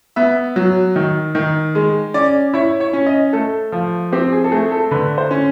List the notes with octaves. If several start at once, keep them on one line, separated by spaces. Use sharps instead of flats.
B3 E5
F#3
D#3
D#3
G#3
C#4 D5
E4 C#5
C#5
C#4
D#5
A3 A4
F3
C4 G4
G#4
A4
A3 G#4
A4
D3 B4
C5
C#4